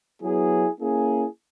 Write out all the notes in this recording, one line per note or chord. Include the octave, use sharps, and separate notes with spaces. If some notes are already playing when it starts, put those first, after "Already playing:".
F#3 B3 E4 G#4
A#3 C#4 E4 G#4